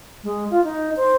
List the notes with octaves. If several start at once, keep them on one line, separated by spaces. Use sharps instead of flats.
G#3
F4
D#4
C5